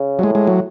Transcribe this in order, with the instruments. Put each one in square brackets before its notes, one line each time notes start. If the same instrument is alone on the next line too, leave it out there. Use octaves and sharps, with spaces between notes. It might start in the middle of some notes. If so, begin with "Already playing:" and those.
Already playing: [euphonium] C#3
[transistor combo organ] F#3
[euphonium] A2 [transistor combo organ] G#3
[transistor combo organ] G#3
F#3